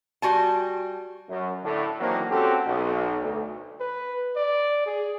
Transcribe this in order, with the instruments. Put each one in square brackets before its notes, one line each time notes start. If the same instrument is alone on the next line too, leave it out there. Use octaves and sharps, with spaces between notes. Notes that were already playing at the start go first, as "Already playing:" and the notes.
[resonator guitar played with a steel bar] G3 F#4 G#5 A5
[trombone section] F#2
A2 D3
D#3 E3 F#3 A#3 C4 D4
C4 C#4 F#4 G4 A4
B1
D2
[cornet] B4
D5
G#4